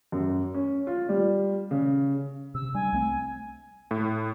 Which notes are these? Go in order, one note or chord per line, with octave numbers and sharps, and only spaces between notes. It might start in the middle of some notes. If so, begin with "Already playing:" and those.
F#2
C#4
F4
G3
C#3
C3 E6
G3 D4 G#5
C2 A3 C4
A2